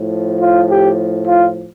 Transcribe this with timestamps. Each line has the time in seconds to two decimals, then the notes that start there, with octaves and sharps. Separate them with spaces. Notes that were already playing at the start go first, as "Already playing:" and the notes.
Already playing: A2 F3
0.41 F4
0.70 G4
1.27 F4